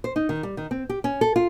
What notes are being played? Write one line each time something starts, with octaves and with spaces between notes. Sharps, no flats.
C5
D#4
D#3
G3
D#3
C4
G4
C#4
A4
F4